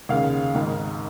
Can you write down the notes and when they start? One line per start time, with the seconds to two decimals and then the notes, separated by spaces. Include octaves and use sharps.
0.09 D#2 C#3 F5
0.55 G#1 G#2 D#3